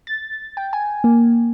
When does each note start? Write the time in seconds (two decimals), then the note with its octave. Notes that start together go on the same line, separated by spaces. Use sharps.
0.07 A6
0.57 G5
0.73 G#5
1.04 A#3